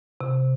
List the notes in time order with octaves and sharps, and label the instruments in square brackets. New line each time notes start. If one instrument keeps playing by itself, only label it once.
[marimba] C3